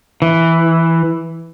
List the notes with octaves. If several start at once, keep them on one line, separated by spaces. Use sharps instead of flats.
E3